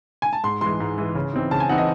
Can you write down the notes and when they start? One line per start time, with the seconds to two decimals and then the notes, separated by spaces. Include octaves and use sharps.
0.22 G#5
0.33 A5
0.44 G#2 C6
0.61 E3 G#3 C6
0.80 G#2
0.98 E3 G#3
1.15 C#3
1.33 E3 C4 D#4
1.51 C#3 A5
1.60 G#5
1.69 E3 C4 D#4 F#5
1.78 D#5